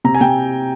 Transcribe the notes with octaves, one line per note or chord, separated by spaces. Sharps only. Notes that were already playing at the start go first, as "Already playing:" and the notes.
C3 A#5
G#5
C3 G5